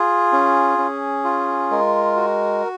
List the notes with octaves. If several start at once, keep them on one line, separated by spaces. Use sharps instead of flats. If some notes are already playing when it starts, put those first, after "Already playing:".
Already playing: F4 G#4
C#4
C#4
F4
G#3 A#4
F#4